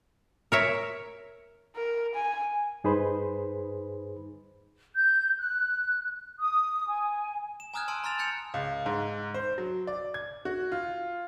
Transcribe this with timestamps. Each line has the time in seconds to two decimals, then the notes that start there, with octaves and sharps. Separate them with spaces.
0.52 A#4 C#5 E5
1.76 A#4
2.15 G#5
2.84 G2 D#4 G#4 B4 C5 B5
4.95 G6
5.39 F#6
6.38 D#6
6.89 G#5
7.60 E7
7.74 G#5 A#5 D#6 F6 F#6 G#6
7.88 A5 C6 E6 D7
8.04 A#5 C6 F6 A6 F7
8.19 F6 G6 A6 C#7 F7
8.54 C#2
8.86 G#2
9.34 C5
9.58 F#3
9.87 D5
10.14 G#6
10.45 F#4
10.72 F4